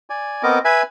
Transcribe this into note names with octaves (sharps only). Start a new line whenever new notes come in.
D5 G#5
B3 C4 A#4 D#5 D6
B4 E5 G#5 B5